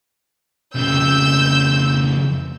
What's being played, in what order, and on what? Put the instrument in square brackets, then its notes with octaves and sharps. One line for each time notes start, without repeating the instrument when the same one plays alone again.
[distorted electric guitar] F2 C#3 [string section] E6 G6